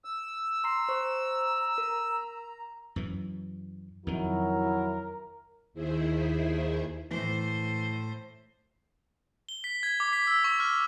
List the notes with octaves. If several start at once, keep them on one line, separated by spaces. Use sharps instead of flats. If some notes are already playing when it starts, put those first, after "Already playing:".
E6
A#5 C6 C7
C5 C#6
A#4
F#2 E3
F2 D#3 F#3 E4 A#4
D#2 D#3 E4 G#4 C5 E5
A2 E3 C5
G7
B6
G#6
D6
B6
E6
C#6
F6